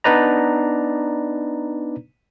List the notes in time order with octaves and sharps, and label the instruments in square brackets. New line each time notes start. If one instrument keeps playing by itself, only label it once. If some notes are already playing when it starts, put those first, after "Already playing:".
[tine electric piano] B3 D4 D#4 B4 D5 A#5